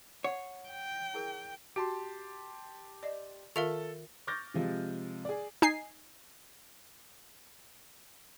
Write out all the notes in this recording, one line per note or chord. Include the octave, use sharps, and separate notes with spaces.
C#5 F#5
G5
E4 G#4 A#4
F#4 G4 A5 C6
D5 D#5
D#3 F4 A4 A#4 E5 F5 F7
C#6 D6 F6 G6 A6 A#6
C3 F3 G#3
G#4 D5
D#4 G#5 C7